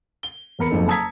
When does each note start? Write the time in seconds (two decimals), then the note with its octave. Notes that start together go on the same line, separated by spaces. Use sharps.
0.23 G7
0.59 E2 B3 A#4 B5 C#7
0.70 F#1 F2 D#4 A4
0.88 A5 A#5 D#6 E6 G#6 B6